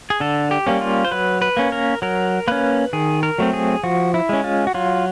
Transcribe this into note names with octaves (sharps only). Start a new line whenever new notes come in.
G#4
D3 A4
G4
G3 A#3 C#4
F4
C5
F#3 B4
B4
A#3 C#4
A#4
F#3 A#4
A#3 C#4 B4
D#3 G#4
A#4
F#3 A3 C4
G#4
F3 F#4
E4
G#3 C#4
F4
F#4
F#3 F4